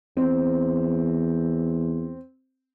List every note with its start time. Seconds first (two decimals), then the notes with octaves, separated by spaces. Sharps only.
0.17 E2 C4